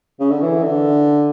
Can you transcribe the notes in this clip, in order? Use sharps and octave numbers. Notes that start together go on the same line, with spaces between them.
C#3
D3
E3
D3